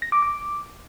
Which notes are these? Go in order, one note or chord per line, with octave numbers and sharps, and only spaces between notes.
A#6
D6
D6